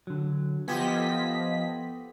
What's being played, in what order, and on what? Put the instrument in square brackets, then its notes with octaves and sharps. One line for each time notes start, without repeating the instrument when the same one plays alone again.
[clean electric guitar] D3 F#3
[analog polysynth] F3 D#5 B6 [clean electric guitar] B3 [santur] G4 C5 G#5
[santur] A4